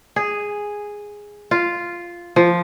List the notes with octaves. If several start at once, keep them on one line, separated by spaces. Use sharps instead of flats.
G#4
F4
F3